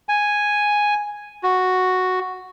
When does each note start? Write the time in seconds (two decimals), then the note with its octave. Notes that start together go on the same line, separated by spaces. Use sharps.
0.09 G#5
1.43 F#4